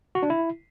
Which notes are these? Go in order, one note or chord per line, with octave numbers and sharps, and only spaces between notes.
F#4
D4
E4